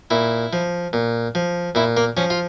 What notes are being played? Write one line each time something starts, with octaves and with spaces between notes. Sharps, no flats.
A#2 E4
F3
A#2
F3
A#2 E4
A#3
F3 C#4
F4